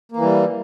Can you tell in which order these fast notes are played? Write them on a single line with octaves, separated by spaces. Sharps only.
A#3 E3 G3